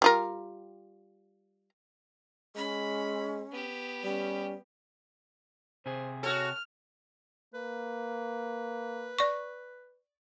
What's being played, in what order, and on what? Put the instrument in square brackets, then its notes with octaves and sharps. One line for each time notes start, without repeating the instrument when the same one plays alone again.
[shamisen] G3 F4 A#4
[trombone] G#3 [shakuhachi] C#4 [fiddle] B5
[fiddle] B3 G4
[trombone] G3 [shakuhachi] C#4
[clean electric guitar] C3 G#4 [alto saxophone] C5
[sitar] F#4 A4 [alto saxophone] C#5 [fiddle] F6
[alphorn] A#3 [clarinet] B4
[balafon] D5 C#6